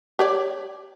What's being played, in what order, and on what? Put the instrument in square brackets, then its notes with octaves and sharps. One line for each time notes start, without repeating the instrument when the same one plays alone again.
[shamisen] G4 C#5 D5